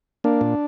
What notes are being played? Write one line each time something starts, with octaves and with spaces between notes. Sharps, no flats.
A#3 D4
A#2